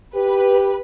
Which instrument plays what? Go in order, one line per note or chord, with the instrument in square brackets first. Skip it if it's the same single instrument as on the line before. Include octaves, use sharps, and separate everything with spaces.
[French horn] G4 [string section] B4